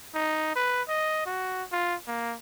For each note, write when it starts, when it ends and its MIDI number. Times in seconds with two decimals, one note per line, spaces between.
0.15 0.55 63
0.56 0.82 71
0.89 1.24 75
1.26 1.63 66
1.72 1.95 65
2.08 2.36 58